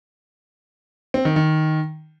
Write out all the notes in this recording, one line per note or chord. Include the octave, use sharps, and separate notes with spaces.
C4
D#3
D#3